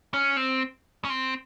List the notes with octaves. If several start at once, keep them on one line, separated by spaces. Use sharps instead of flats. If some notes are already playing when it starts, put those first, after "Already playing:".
C#4
C4
C#4
C4